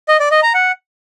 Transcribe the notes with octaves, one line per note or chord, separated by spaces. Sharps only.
D#5
D5
D#5
A#5
F#5